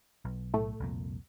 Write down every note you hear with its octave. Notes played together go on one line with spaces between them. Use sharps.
B1
A2 A3
C2 F2 A#2